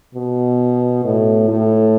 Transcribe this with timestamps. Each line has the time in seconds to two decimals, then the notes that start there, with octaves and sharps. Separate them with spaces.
0.15 B2
1.05 A2
1.49 A2